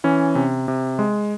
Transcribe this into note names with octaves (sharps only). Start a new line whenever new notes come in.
E3 C#4
C3
C3
G#3